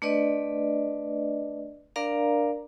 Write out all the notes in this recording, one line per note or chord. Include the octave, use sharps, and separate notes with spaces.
A3 D4 B4 D5 D#5
D4 A#4 D5 F5 A#5